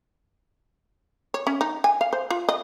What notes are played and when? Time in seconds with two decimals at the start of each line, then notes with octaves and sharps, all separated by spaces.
1.34 C#5
1.47 C#4
1.61 D#4
1.84 G#5
2.01 F5
2.13 C5
2.30 F4
2.49 D#5